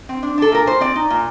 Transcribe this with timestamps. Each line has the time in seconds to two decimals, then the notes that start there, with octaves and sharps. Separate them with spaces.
0.09 C4
0.23 D4
0.38 D4 A4
0.52 A#2 A#4
0.66 A#2 C5
0.81 C4 D5
0.96 D#4
1.10 A#2